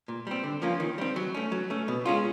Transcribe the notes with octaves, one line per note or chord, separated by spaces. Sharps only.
A#2
G3 C4
D3
F3 A#3 C#4 F4
D#3
G3 C4
F#3
A3 C#4
F#3
A3 C#4
B2
G#3 C#4 F4